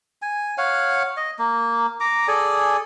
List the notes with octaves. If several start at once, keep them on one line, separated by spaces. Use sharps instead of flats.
G#5
C#5 F5 F#5
D#5
A#3
A#5 D6
G#4 A4 D5 G#5